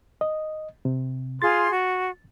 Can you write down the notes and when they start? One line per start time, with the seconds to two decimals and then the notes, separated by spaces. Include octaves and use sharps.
0.21 D#5
0.85 C3
1.42 F4 G#4 C6 A6
1.72 F#4